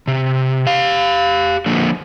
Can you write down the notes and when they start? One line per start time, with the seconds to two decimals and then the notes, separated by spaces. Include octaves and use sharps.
0.08 C3
0.67 G4 F5
1.66 D3 F3 A#3